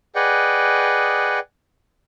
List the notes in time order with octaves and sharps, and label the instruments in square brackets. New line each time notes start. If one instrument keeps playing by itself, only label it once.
[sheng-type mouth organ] G#4 B4 D5 D#5 F#5 G5